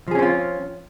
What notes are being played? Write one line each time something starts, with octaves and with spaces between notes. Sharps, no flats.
F3 C4 C#4 F4 G#4